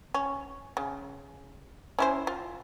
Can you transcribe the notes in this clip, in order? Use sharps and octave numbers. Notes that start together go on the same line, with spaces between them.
C#4
C#3
C#4 E4 C5
F4